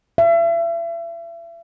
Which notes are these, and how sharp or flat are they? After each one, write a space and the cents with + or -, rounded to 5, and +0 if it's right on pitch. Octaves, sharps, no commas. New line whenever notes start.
E5 +35